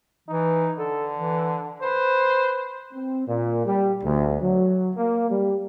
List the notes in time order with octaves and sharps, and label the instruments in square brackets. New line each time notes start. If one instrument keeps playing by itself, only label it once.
[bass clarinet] E3 [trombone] D#4
[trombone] D3 [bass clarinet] A4
[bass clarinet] E3
[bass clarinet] B4 [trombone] C5
[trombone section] C4
A#2
G3
D2
F#3
A#3
G3